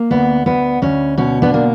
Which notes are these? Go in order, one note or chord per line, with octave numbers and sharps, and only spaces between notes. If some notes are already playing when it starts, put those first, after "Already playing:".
Already playing: A#3
D2 B3
D2 B3
D2 C#4
B2 C#4
B3 D4
A#3